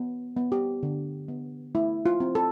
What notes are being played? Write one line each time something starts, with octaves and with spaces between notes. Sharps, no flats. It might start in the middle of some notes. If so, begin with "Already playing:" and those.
Already playing: B3
B3
G4
D3
B3
A3 E4
F4
C4
A4